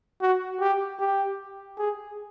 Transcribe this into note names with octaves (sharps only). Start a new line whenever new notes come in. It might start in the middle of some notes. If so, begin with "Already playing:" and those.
F#4
G4
G4
G#4